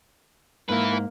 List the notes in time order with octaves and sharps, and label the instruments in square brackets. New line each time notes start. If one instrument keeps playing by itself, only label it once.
[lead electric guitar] G#2 [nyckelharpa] A#3 [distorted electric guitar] E4 B4